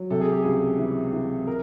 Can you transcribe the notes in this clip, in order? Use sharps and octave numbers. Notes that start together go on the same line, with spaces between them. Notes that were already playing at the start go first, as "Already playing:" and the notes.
Already playing: F#3
C3 A4
G#4
G4
C#2 G#4
E3
E3
A#4